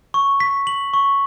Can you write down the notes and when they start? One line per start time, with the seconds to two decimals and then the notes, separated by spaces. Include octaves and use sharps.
0.14 C#6
0.40 B6
0.67 F#7
0.93 C#6